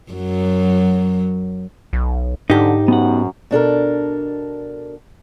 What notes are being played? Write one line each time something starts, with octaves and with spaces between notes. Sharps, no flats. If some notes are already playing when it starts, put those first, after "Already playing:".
F#2 F#3
B1
G#2 D3 D#4 G4
F#2 B3 F#5
B2 D4 A4 A#4